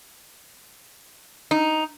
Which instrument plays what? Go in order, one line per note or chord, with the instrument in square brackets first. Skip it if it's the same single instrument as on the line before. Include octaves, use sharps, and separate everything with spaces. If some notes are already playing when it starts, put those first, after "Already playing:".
[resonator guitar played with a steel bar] D#4